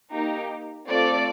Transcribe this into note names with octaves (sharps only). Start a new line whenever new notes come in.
A#3 D#4 G4
A3 C4 F4 A4 D5